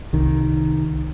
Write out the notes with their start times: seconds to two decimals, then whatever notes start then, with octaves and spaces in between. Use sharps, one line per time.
0.13 C2 D#3